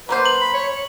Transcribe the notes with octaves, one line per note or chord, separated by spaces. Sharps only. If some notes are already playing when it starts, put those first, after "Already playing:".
F#3 A#3 B4 C5
F#7
B5
C#5
C#5